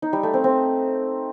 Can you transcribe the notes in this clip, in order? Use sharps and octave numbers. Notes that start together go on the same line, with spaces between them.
D#4
G3
A3
C4
C4